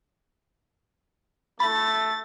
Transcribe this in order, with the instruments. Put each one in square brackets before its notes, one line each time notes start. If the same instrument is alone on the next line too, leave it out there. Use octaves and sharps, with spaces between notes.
[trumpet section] A3 [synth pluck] B5 [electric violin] A6